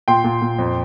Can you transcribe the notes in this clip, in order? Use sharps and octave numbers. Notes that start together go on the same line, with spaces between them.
A#2 G5 C6
A#2
A#2
F2